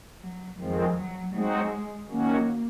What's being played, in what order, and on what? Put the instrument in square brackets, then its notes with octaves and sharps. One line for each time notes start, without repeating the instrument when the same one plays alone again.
[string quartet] F#3
[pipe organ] F2 D#3 G#3 C4 [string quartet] F3
[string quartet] F#3
[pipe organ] F#3 C4 D#4 F#4 [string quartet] G#3
[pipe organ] D#3 F#3 C#4 F#4 [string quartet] A#3